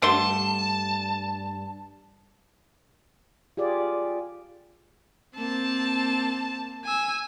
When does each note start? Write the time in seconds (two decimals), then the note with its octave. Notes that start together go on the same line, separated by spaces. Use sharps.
0.02 G2 D3 A3 A5 C6
3.57 F4 G4 G#4 D5
5.37 A#3 C4 A5
6.85 G#5 E6